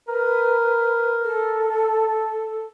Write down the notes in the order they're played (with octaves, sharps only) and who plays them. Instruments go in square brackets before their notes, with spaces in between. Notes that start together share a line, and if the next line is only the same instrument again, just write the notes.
[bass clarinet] A#4 [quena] B4
[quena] A4